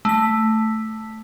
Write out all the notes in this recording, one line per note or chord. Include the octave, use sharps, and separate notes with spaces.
A3 B6